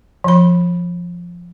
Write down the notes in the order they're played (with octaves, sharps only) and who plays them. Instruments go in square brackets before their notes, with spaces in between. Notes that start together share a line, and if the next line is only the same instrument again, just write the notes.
[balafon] F3 B5